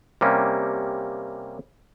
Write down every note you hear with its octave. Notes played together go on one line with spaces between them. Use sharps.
C3 G3 A#3 C#4